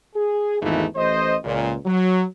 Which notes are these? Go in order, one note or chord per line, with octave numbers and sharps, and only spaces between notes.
G#4
G#1 E2 E3 A3 D#4 F4
A1 C5 D#5
C#2 A#2
F#3